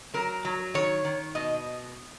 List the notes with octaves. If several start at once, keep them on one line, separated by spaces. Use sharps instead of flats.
F#3 A#4
F#3
D#3 C#5
D#3
B2 D#5